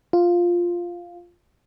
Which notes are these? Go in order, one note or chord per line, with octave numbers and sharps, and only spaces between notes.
F4